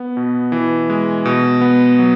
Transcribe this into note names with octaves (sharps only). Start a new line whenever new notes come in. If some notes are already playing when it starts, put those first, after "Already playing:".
Already playing: B3
B2
E3
G#3
B2
B3
F#3